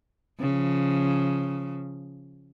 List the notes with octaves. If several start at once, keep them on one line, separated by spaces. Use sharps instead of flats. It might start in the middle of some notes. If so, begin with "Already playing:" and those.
C#3 F3